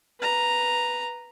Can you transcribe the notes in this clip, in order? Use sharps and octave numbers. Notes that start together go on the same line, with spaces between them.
B4 A#5